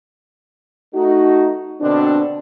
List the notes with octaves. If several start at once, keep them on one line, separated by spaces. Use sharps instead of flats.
A3 D#4 F#4
B2 D3 C4 D4